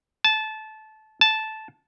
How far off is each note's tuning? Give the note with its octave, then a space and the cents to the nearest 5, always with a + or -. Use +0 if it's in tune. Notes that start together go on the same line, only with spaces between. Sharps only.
A5 -20
A5 -10